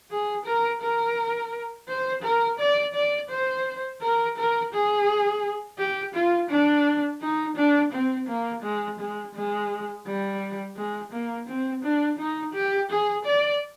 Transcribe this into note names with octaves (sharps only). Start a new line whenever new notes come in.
G#4
A#4
A#4
C5
A#4
D5
D5
C5
A#4
A#4
G#4
G4
F4
D4
D#4
D4
C4
A#3
G#3
G#3
G#3
G3
G#3
A#3
C4
D4
D#4
G4
G#4
D5